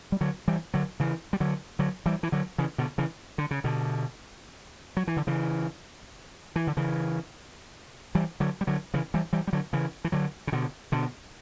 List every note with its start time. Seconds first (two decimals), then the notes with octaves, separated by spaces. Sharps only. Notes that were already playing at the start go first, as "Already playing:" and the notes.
0.12 G3
0.21 D3 F#3
0.48 E3 G3
0.74 D3 F#3
1.00 C#3 E3
1.33 G3
1.40 D3 F#3
1.79 D3 F#3
2.06 E3 G3
2.23 E3
2.32 D3 F#3
2.58 C#3 E3
2.78 B2 D3
2.98 C#3 E3
3.38 D3
3.51 C#3
3.64 B2 D3
4.97 F#3
5.07 E3
5.17 D3
5.27 C#3 E3
6.56 E3
6.67 D3
6.77 C#3 E3
8.15 E3 G3
8.40 D3 F#3
8.61 G3
8.67 D3 F#3
8.94 C#3 E3
9.14 E3 G3
9.33 E3 G3
9.47 G3
9.53 D3 F#3
9.73 C#3 E3
10.04 E3
10.12 D3 F#3
10.47 C#3
10.52 B2 D3
10.92 B2 D3